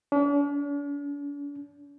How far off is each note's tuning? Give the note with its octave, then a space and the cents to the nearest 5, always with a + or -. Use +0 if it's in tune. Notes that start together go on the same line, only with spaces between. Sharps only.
D4 -45